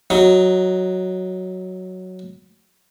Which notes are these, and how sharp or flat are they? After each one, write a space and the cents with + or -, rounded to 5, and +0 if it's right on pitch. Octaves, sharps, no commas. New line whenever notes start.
F#3 +0 D#4 +10